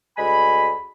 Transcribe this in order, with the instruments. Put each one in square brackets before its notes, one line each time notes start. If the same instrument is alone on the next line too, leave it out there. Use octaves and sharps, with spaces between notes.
[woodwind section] D2 G#3 G#5 B5